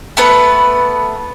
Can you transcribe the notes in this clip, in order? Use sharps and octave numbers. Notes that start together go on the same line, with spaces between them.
A3 B3 B4